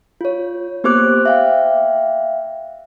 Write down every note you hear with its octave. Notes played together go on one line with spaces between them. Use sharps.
F4 C#5
A#3 B3 G4 C5 D6 F#6
E5 F5 G5